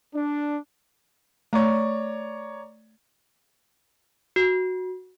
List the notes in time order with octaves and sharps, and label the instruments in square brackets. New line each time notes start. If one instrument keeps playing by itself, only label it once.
[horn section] D4
[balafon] A3 [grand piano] C#5 D5 A#5
[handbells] F#4